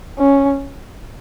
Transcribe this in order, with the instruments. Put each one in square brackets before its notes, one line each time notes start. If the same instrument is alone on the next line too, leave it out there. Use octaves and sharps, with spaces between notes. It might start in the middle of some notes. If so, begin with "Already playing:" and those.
[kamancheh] C#4